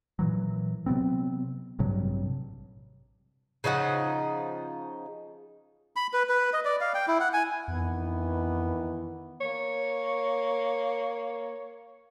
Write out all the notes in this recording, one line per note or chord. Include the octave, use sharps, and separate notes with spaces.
A#2 E3 F#3
C3 F#3 B3 C4
A1 G2 C3 F#3
C#3 F3 D#4 F#5
B5
B4
B4
D#5
D5
F5
G5
E4
F#5
G#5
F2 D#3 E3 B3
A#3 C#5